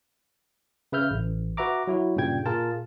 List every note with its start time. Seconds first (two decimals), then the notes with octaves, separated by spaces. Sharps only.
0.92 C#3 B4 E5 F6 G6
1.11 A1
1.57 F#4 B4 E5 A#5 D6
1.87 F#3 E4 F#4
2.16 G2 A#2 C#3 G3 G5 G#6
2.46 A#2 F4 G#4 A#4 A5